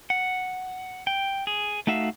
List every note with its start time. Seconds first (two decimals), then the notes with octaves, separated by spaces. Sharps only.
0.10 F#5
1.07 G5
1.47 G#4
1.87 A3 D#4 F#4 E5 F5